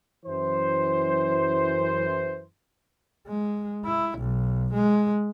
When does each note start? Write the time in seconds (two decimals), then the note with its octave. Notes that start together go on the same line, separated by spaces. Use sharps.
0.26 F#2 E3 C5
3.27 G#3
3.85 E4
4.18 B1
4.74 G#3